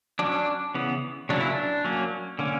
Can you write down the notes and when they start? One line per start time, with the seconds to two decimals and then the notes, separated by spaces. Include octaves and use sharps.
0.19 F#3 C#4 D4
0.75 C#3 E3 B3
1.29 C#3 F#3 A#3 C#4 D4
1.41 E4
1.52 D4
1.84 F#3 A#3 C#4
2.39 D3 A#3 C#4